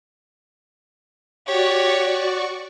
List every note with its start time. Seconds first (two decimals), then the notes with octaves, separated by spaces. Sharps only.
1.47 F#4 G4 C#5 D5 C#6